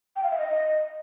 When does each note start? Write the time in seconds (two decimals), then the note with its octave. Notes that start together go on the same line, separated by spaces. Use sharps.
0.16 G5
0.23 F5
0.31 E5
0.38 D#5